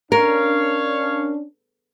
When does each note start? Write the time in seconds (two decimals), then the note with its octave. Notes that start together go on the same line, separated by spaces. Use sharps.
0.12 C#4 D4 A#4 C#5 F5